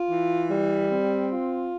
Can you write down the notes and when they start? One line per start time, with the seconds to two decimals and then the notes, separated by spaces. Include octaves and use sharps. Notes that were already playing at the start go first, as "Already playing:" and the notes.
Already playing: F4
0.10 E3
0.50 G3
0.90 C4
1.29 F4